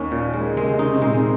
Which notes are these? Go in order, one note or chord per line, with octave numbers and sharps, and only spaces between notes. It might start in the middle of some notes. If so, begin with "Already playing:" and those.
Already playing: D#2 D#3 C#4
A#2
G#3
A#3
C3 G#3 C4
C#3 C#4 D#4
C4
A#2 G#3 A#3